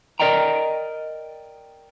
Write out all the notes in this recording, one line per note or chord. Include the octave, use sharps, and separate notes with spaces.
A#4 D5 D#5 G5 A#5